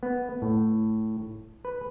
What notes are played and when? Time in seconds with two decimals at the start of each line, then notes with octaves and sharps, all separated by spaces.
0.03 B3
0.42 A2
1.65 B4